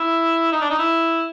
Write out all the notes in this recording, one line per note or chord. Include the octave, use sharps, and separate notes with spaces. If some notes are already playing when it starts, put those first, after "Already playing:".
Already playing: E4
D#4
D4
D#4
E4